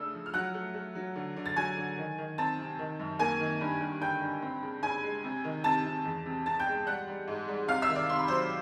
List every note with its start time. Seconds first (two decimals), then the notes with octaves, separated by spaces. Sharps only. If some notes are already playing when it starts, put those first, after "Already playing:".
Already playing: C#3 A3 D4 E6
0.14 F3
0.26 F6
0.34 F#3 F#5 F#6
0.54 A3
0.74 A3
0.95 F#3
1.16 D3
1.36 D3
1.46 A6
1.56 F#3 G#5 G#6
1.77 D3
1.98 D#3
2.18 D#3
2.38 C4 A5 A6
2.59 C3
2.79 D#3
2.99 F#2
3.19 A#3 G#5 G#6
3.40 D#3
3.61 G2
3.81 G2
4.01 D3 G5 G6
4.22 G2
4.42 C4
4.62 C#3
4.83 C#3 G#5 G#6
5.03 G#3
5.24 C3
5.44 D#3
5.64 C3 A5 A6
5.85 C3
6.05 E2
6.26 C3
6.46 C3 A5 A6
6.59 G5 G6
6.67 G#3
6.86 G3 F#5 F#6
7.07 G3
7.28 G#2
7.48 G3
7.68 C3 F5 F6
7.82 E5 E6
7.89 D#3
7.95 D5 D6
8.09 C3 C6
8.19 B5
8.28 F#3 C5 C6